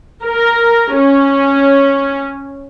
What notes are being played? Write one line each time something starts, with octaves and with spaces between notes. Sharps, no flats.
A#4
C#4